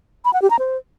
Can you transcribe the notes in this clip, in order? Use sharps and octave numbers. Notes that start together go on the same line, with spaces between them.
B5
F#5
G4
A#5
C5